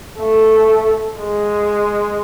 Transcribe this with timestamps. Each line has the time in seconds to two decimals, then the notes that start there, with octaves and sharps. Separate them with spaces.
0.19 A3
1.20 G#3